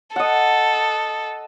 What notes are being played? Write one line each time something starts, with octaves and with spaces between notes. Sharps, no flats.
A4 D#5 F#5